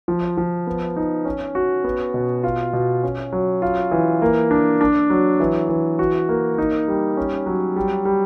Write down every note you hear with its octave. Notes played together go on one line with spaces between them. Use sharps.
F3
F3
B3
D#4
C#4
F#4
B3
B2
F4
B2
C#4
F#3
F4
E3
A#3
D4
D4
F#3
E3
E3
F#4
A#3
D#4
G3
C#4
F#3
G3
G3